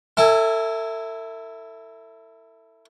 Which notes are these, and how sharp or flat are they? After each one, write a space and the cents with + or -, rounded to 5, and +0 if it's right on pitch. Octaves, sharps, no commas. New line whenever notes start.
E4 +0 A4 +40 G#5 +0